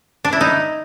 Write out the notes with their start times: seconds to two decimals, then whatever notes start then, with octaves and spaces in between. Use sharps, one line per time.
0.25 D4
0.33 E4
0.41 D#4